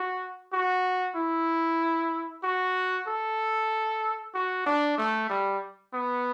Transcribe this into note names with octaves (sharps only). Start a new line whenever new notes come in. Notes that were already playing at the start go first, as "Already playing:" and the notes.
Already playing: F#4
F#4
E4
F#4
A4
F#4
D4
A3
G3
B3